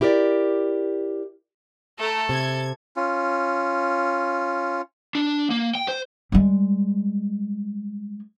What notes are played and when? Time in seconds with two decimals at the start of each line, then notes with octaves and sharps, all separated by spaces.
0.01 E4 G4 A#4 B4 D5
1.99 A3 A4 A#5
2.29 C3 G#6
2.96 C#4 F4
5.15 D4
5.50 A#3
5.75 G5
5.88 C5
6.32 G3 G#3